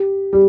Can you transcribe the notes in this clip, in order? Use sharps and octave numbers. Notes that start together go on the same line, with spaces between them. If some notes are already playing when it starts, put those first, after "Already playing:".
Already playing: G4
G3